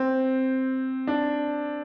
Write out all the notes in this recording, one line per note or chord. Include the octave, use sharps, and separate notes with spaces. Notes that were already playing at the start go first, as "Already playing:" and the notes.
Already playing: C4
D4